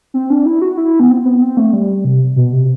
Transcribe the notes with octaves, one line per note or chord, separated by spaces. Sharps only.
C4
D4
E4
F#4
E4
B3
C4
B3
C4
A3
G3
C3
B2
C3